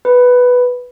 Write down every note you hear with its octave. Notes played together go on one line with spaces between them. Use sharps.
B4